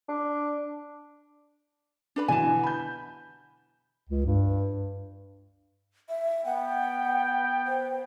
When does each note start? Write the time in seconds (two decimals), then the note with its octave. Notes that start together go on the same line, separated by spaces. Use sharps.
0.09 D4
2.16 D4 B4 B5
2.28 B2 D3 E3 G#5 A5
2.63 B5 G6
4.09 C#2
4.26 G2
6.09 E5
6.46 B3 F#5 G5
7.67 C5